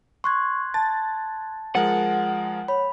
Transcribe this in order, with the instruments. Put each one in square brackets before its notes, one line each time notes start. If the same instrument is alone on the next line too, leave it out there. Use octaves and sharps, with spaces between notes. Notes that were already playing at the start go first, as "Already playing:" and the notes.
[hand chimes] C6 F#6 G#6 [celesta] C#6
[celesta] A5 [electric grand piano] A6
[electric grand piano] F3 G#3 A#4 [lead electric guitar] F#5 [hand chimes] A6
[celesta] C#5 [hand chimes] B5